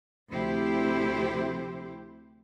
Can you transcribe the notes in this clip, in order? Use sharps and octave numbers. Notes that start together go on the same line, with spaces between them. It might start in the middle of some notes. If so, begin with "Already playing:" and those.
D2 C3 F3 E4 G4 C5